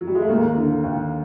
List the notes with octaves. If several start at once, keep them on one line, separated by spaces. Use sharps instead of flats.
F#3
G3
G#3
A3
D#2 A#3
D3
D#2